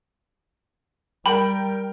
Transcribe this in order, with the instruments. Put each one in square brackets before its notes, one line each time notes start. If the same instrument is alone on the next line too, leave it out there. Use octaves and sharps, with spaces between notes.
[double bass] G3 [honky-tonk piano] A#4 G5 [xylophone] B5